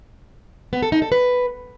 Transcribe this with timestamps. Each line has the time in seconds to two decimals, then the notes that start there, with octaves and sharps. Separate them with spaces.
0.73 B3
0.82 A4
0.92 D#4
1.02 A4
1.12 B4